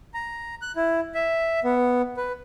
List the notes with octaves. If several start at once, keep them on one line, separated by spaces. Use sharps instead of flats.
A#5
F#6
E4
E5
B3
B4